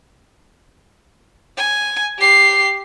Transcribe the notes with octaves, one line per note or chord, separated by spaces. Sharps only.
G#5
G4 C7